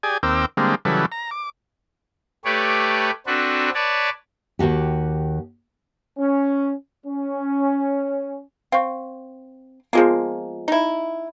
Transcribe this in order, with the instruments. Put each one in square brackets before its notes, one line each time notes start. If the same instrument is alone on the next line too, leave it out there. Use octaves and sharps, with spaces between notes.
[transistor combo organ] G4 G#4 D5 G#5
D#2 C4 A#4 G5 D6 E6
D3 G3 G#3 A#3 C4
C#3 E3 F#3 G3 A4 B4
A#5
D6
[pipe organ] A3 G4 B4 C#5 D5
C4 D4 F#4 A4 B4
B4 C#5 D5 A5
[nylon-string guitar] D#2 G#2 F#4 G4
[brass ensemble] C#4
C#4
[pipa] C4 [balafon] F5 C#6
[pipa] F3 G#3 A#3 [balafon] B3 F4 G#4
[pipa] D#4 E4